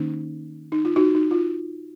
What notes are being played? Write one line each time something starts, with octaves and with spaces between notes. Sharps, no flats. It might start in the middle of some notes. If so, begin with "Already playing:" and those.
Already playing: D#3 A#3 C#4 D#4
D#4
F4
D#4 F#4
D#4
F4